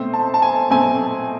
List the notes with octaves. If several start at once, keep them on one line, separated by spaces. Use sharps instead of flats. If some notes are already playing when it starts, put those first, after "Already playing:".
Already playing: B2 A3 C4 C5
A5
A5
G#5
B2 A3 C4 G#5